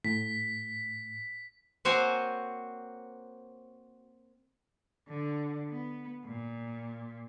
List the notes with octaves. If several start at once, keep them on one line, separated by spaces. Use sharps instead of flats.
A2 B6
A#3 C4 F#4 C5 C#5 G#5
D3
B3
A#2